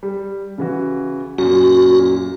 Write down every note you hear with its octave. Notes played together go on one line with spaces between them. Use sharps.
G3
C#3 E3 F#4
F#2 A#2 F#4